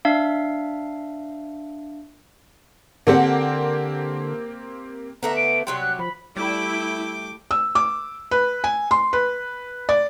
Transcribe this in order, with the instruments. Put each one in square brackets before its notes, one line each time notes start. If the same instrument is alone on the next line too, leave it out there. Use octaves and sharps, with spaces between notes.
[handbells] D4 E5 F5
[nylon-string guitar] D3 F#5 [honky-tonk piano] A#3 C4 G4
[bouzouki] D3 A3 E5 [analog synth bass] B3 [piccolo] A#5
[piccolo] D7
[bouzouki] C3 F#3 G4 [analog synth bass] G3 [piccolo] C6
[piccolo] F#6
[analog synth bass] F3 [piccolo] B5
[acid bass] G3 [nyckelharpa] A3 G5 [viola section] E4 [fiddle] D6
[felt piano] E6
D6
B4
G#5
C6
B4
D5